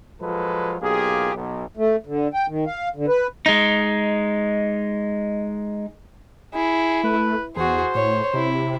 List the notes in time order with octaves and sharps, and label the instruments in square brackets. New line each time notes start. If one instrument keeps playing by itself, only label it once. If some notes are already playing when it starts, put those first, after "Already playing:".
[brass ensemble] F3 F#3 G#3 F4 A4 B4
B1 A#3 F4 G4 G#4
B1
[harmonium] A3
D3
G5
D#3
F5
D3
B4
[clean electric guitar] G#3 D#4
[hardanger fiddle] E4 [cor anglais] G#4
[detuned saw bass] A3 [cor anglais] B4
[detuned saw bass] E2 [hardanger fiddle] F#4 G#4 [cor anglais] C5
[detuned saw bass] A2 [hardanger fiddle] C#5
[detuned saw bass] C3 [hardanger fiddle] E4